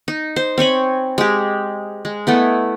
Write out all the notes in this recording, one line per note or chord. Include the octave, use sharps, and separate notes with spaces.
D#4
C5
C4 C#5 G#5 B5
G#3 G4
G#3
A3 B3 E4